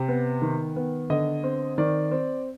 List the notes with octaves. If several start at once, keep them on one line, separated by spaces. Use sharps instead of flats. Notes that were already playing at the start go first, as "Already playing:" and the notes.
Already playing: C3 G5
B3
D#3
B3
D3 D#5
C4
D#3 D5
C4